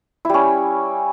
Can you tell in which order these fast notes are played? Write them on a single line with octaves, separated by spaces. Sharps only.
E4 G3 C#4